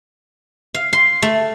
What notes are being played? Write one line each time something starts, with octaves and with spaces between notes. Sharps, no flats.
F5
C6
A3